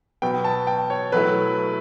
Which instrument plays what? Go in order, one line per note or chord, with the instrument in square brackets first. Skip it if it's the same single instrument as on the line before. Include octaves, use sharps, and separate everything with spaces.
[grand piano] B2 F#3 B3 G5
A5
G5
C#5
B2 F#3 A3 E4 B4